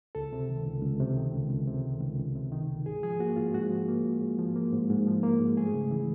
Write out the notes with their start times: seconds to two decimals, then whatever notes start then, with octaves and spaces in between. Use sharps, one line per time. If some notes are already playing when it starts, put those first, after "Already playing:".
0.15 C#2 A4
0.33 C3
0.49 D#3
0.66 C#2
0.83 C#2
1.00 C3
1.17 D#3
1.33 C#2
1.50 C#2
1.68 C3
1.85 D#3
2.01 C#2
2.19 C#2
2.35 C3
2.52 D#3
2.69 C#2
2.86 G#2 G#4
3.03 F3 G#4
3.20 A#3 F#4
3.36 G#2 F4
3.54 G#2 F#4
3.70 F3
3.88 A#3
4.05 G#2
4.22 G#2
4.38 F3
4.56 A#3
4.73 G#2
4.89 G#2
5.07 F3
5.23 A#3
5.40 G#2
5.57 A3 G#4
5.74 C#3
5.91 E3